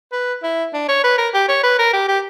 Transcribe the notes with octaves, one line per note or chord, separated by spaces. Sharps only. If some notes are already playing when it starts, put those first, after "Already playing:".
B4
E4
D4
C#5
B4
A#4
G4
C#5
B4
A#4
G4
G4